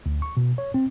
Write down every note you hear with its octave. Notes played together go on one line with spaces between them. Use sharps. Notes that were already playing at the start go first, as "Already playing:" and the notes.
D2
C#6
B2
C#5
C4